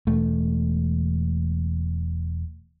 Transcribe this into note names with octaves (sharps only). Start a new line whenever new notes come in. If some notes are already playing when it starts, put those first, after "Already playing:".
E1 A3